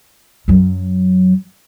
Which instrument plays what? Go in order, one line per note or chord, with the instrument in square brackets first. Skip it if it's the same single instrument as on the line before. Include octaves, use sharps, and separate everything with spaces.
[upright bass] F#2 F#3